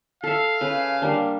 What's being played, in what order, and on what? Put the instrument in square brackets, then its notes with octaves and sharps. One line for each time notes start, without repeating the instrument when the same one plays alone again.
[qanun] A4 E5 [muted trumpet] F5
[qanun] C#3 B4
G3 A#3 D4